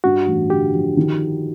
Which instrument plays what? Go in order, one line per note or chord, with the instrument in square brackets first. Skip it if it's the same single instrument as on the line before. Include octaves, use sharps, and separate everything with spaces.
[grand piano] G2 [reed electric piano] F#4
[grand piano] A1
[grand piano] D3 [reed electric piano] G4
[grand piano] F3
D#3